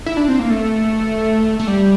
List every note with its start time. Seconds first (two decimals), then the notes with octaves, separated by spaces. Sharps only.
0.06 E4
0.17 D4
0.28 C4
0.39 A#3
0.50 A3
1.59 A3
1.67 G3